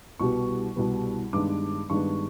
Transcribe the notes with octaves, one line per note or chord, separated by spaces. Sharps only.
C2 B2 G3 B3 C#6
C2 B2 G3 B3
G2 D#3 G#3 B3 D4 D6
G2 D#3 G#3 B3 D4 C#6